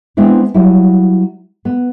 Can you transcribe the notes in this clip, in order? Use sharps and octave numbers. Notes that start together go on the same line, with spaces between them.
G#3 B3 C4 D4 E4
F#3 G3 E4
B3